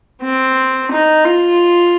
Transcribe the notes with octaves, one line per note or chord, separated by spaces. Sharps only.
C4
D#4
F4